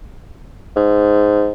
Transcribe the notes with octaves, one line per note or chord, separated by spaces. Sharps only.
G#2